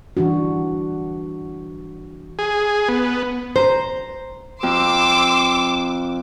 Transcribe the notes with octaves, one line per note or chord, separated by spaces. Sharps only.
E3 G3 D4 F#4
G#4
B3
C5 A#5
F2 C6 D6 E6